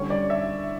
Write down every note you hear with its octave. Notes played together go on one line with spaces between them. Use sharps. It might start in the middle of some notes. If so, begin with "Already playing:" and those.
Already playing: D3 G3 C#4 C#5
D5
E5